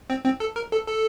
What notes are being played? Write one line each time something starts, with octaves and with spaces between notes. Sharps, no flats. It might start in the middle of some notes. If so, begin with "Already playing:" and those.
C4
C4
A4
A#4
A4
A4